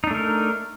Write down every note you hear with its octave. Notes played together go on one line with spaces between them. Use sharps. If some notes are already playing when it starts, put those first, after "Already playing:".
A3 D4 D#4 A#4